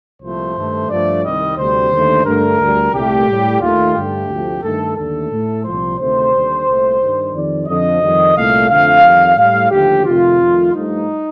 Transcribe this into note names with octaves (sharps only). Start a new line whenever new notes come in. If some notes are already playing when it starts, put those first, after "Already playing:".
C2 A#2 F3 A3 C5
G2 D#3 A3
G2 F3 A3 D5
C2 C3 D#3 G3 D#5
D2 C3 G3 C5
D#2 D3 A3
G2 D3 A3 A#4
D2 D3 G3
C2 A#2 A3 G4
A2 G3
D#2 D#3 A3 F4
G2 D3 A3 G4
D2 C3 F3 A3
G2 D#3 A3 A4
D#2 D3 A3 A4
A2 A3
C2 A#2 F3 C5
D2 C3 D#3 A3 C5
D#2 D3 G3
C2 A#2 A3
G2 D#3 G3
F2 D#3 G3 D5
F2 D3 F3 D#5
F2 D#3 G3
C2 A#2 A3 F5
F2 D3 F3 A3 F5
F2 D#3 G3
A2 G3 F5
D#2 D3 F3 A3 G4
F2 C3 D#3 A3 F4
F2 D#3 A3
G2 F3 A3 D#4